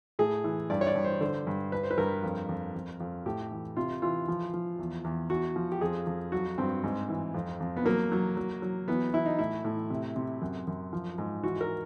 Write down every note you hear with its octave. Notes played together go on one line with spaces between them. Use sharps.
A2 G#4
E3
G2 D5
C#5
D5
G2
C5
D3 C5
G2
G2 B4
C5
B4
G2 A#4
F2
F2
F2
F2
A2 G4
E3
C3 F4
E3 F4
F3
F3
E2
E2
E2 F#4
F3
G4
F2 G#4
F2
F#3 F#4
G2 C4
G#2
E3
F2
F2
B3
F#3 A#3
F#3
F#3
F#3
E3 B3
E3 E4
D#4
A2 E4
A2
C3
C3
F#2
F#2
F3
G#2
E3 F#4
A#4